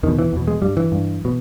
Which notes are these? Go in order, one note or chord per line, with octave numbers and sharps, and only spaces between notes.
E2 B2 D#3
E3
E2 B2
G#3
G2 G3
E3
G2
B2